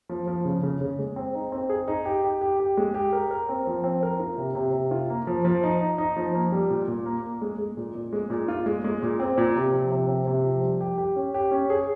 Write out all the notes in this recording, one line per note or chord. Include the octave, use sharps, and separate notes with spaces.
F3
F3
C#3
C#3
C#3
G#3
C4
D#4
C4
G#4
D#4
G4
G4
G4
G4
G#3
G4
A#4
A#4
C4
F3
C4
A#4
F4
C3
C3
C3
F4
A#3
F3
F3
D#4
D#4
D#4
F3
A#3
G3
A#2
A#2
A#3
A#3
G#3
G#3
A#2
A#2
G#3
A#2
F4
G#3
G#3
A#2
C4
A#2
C3
F3
C3
C4
C3
F3
G3
G4
G4
C#4
G4
C#4
G#4